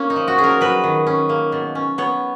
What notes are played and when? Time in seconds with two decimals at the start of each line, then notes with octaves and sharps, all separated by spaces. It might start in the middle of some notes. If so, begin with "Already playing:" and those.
Already playing: A#3 C#4
0.10 D#4
0.16 F3
0.28 F#4
0.38 C#4 G#4
0.44 A#4
0.61 F#3 B4
0.84 D#3
1.07 C#4
1.29 A#3
1.52 B2
1.75 C#4
1.98 B3 C#5